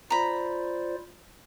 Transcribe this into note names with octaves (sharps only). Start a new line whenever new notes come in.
F4 C5 D5 A#5 B5